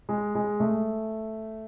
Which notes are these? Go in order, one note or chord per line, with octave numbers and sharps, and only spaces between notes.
G#3
G#3
A3